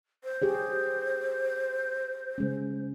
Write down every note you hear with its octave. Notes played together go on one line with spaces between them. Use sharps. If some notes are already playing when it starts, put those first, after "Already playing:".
C5
G4 G#4 C#5
C#3 G#3 C#4